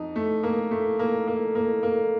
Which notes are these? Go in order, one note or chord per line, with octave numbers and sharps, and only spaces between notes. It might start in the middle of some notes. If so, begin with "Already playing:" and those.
Already playing: F2 D#4
A3
A#3
A3
A#3
A#3
A#3
A#3